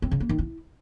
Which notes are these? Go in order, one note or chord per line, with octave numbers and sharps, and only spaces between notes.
C4
C#3
A#3
D#3
E4